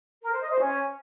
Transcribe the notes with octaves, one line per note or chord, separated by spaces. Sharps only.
A#4
C5
D#5
C5
C#4